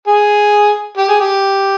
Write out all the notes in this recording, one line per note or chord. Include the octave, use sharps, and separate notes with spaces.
G#4
G4
G#4
G4